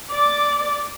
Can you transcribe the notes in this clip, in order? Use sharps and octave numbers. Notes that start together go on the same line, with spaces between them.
D5 D6